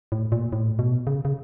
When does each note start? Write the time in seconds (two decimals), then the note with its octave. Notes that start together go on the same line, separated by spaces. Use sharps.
0.12 A2
0.32 A#2
0.53 A2
0.79 B2
1.07 C#3
1.25 C#3